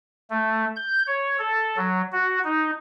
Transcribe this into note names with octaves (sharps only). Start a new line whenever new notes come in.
A3
G6
C#5
A4
F#3
F#4
D#4